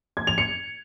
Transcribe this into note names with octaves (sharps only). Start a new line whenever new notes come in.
G#6
F7
C#7